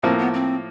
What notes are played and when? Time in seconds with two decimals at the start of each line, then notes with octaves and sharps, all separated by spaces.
0.03 A2 F3 A#3 C4
0.18 B3
0.34 C4